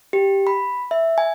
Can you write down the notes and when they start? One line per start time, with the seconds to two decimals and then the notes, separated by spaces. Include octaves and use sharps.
0.13 G4
0.47 B5
0.91 E5
1.18 G#5